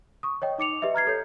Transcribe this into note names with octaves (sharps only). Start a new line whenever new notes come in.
C#6 D#6
C#5 D#5 G5
D#4 D6 C#7 F7
G4 B4 D#5 E5
A#5 F6 G#6 C7
A4 C#5 G6